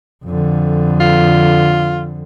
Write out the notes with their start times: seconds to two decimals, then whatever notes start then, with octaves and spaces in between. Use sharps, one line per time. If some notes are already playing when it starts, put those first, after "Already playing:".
0.25 F2 D3
1.00 F4